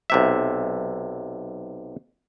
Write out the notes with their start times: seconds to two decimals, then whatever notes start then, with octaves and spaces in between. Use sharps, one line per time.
0.10 B1 C3 E5